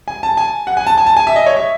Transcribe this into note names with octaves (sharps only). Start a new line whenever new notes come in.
G#5
A5
G#5
F#5
G#5
A5
G#5
A5
G#5
E5
D#5
C#5
E5